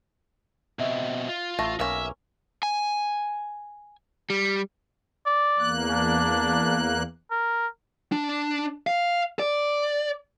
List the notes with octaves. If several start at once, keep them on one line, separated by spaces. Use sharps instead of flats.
B2 C4 D#5 E5
F4
A1 A3 A#6
B1 A#3 C#4 E5
G#5
G3
D5
E2 A#3 F#6
D4
A#4
D4
F5
D5